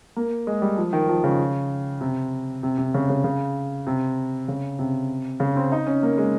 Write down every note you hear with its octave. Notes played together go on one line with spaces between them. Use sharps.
A#3
G#3
G3
F3
D#3
F3
C#3
C3
C3
C3
C#3
C#3
C#3
C3
C#3
C3
C#3
C4
D#4
C#4
A#3
G#3